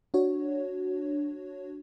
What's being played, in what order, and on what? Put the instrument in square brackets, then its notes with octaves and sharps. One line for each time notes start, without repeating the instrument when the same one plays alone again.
[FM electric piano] D4 F#4 C#5